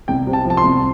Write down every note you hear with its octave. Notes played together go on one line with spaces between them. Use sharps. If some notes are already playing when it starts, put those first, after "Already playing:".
C2 G5
C3
A5
F3
A5
C6
C2